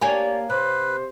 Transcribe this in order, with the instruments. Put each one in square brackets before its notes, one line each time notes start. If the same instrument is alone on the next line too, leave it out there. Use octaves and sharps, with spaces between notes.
[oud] A#3 D4 G4 [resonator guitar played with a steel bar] C#5 G#5 A#5 [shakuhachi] D5
[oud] C3 [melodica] B4 [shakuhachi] C5